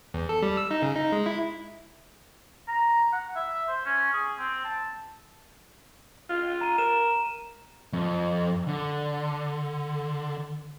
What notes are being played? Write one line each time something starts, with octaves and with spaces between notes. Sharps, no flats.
E2
A4
G3
E6
D#4
C#3
D#4
G#3
E4
A#5
F#5
E5
C5
C#4
G#4
C4
A5
F4
A#5 D#7
A#4 E7
F2
D3